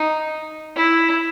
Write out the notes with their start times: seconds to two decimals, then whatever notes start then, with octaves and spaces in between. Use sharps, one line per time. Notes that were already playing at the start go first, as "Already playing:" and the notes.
Already playing: D#4
0.76 E4